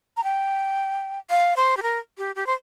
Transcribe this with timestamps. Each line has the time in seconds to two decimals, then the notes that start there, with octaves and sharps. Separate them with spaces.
0.17 A#5
0.24 G5
1.30 F5
1.56 C5
1.77 G4
1.82 A#4
2.18 G4
2.35 G4
2.46 C5